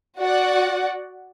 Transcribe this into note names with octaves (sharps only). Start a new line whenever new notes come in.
F#4 D5 F#5